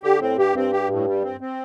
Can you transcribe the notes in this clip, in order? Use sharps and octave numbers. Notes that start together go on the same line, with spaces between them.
D3 G4
A2 C4
G2 G4
G2 C4
G4
A2
G3
C4
C4